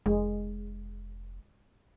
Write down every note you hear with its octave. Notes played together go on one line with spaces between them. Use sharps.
F1 G#3